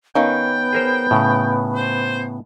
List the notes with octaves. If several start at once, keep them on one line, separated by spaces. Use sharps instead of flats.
D#3 B3 C#4 F5 G5
G#4 A#4 C5
A2 C#3
C5